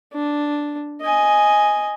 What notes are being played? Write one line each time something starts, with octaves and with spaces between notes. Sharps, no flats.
D4
D#5 G#5